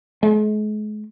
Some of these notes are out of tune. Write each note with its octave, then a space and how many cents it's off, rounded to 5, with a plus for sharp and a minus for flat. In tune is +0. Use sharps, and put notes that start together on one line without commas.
G#3 +40